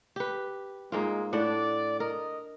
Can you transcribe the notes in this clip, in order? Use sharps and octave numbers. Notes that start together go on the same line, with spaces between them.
G4 B4
G#2 G#3 A#3 F4
A2 D4 D5 F#5
A#4 D#5